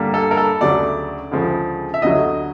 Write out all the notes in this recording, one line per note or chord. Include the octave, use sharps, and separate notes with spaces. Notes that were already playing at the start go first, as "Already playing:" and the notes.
Already playing: G2 D3 G3 A#3
A4
A#4
A4
D2 C#3 F#3 A3 D5
D2 C#3 F3 G#3
E5
D2 D3 F#3 D#5